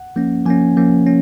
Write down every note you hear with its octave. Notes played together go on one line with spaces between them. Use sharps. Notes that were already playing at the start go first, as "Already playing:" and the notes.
Already playing: F#5
F3 A#3 C#4
F3 A#3 C#4 G#5
F3 A#3 C#4
C#4